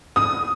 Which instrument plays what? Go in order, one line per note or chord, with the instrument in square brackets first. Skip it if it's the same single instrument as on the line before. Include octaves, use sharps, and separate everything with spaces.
[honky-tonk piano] D#6